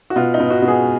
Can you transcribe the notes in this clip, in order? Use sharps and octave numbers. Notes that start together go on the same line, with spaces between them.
F#4
B2 F4
D#4
B2
F#4
B2
G#4